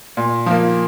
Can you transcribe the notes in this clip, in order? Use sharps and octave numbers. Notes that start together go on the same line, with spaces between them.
A#2
F3 A#3